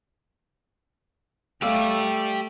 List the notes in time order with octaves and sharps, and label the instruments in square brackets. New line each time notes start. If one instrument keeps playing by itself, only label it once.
[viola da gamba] A3 [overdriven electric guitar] G4 D5 [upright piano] F5 E6